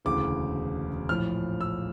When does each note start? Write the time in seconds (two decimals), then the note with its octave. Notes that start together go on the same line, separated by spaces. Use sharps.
0.05 E1 D2 C#3 E3 D6
1.09 A#1 A2 F3 F6
1.61 E6